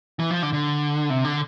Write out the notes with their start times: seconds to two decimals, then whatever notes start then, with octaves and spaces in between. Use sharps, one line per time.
0.19 E3
0.31 F3
0.43 D3
0.53 D3
1.10 C3
1.25 D3